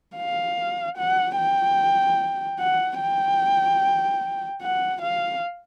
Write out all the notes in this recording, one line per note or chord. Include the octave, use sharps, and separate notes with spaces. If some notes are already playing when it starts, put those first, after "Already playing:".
F5
F#5
G5
F#5
G5
F#5
F5